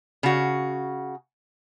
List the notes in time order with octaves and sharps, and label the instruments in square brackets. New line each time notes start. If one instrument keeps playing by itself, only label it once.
[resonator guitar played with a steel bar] C#3 F#4